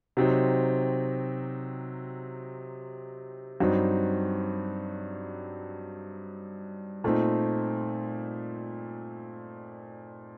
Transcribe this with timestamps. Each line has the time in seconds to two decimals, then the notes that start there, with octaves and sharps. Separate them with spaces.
0.17 C3 F#3 C4 D#4
3.60 G2 F#3 C4 D#4
7.04 A#2 A3 C4 D#4